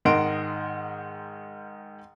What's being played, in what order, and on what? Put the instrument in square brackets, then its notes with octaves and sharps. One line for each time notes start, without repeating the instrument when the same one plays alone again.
[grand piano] G#2 D#3 D#5 F#5 C6 D7